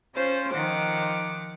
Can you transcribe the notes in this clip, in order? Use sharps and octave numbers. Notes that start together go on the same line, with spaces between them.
C#4 F4 C5
D#3 F3 C5 F#5 D6